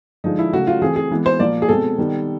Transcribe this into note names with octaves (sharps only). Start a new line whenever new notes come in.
D3 F3 G#3 D#4
E4
C#3 F#3 A3 F#4
F4
E3 A3 C4 G#4
G#4
E3 G#3 B3
C5
A#2 F3 A#3 D5
G#4
B2 G#3 C4 A4
D#3 G3 B3